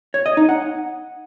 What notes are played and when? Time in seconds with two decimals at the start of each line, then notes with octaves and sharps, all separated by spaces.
0.14 C#5
0.26 D#5
0.37 D#4
0.49 F#5